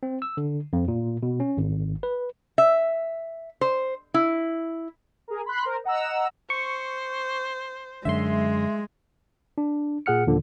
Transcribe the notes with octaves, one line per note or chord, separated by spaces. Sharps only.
C4
E6
D3
F2
A#2
B2
C#4
G#1
B4
E5
C5
E4
G#4 A#4
B5 C6 F#6
A#4 C5
D#5 F#5 A#5 E6
C5 C#6
F#2 D3 G#3 E5 C6
D4
A#2 G#4 F#5 F6 C#7
D#2 A#2 D3 F3